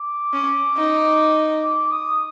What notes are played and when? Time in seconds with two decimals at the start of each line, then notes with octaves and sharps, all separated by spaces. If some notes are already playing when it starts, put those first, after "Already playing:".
Already playing: D6
0.33 C#4
0.76 D#4
1.62 D6
1.91 D#6